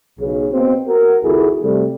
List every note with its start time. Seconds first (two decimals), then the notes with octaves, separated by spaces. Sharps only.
0.20 B1 C#3
0.52 B2 A#3 C4
0.87 F#4 A#4
1.23 G#1 C#2 E4 F#4 G#4 A4
1.62 C3 G3 A3